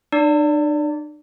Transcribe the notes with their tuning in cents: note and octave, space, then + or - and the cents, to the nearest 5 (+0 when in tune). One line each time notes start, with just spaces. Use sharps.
D4 +45 D5 -20